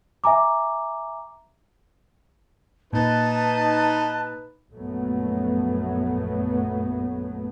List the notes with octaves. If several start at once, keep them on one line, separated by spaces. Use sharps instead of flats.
E5 G#5 A#5 D6
A#2 D#4 B4 A5
A#1 F#2 F#3 A3 B3